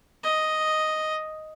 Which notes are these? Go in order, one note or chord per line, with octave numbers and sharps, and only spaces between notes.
D#5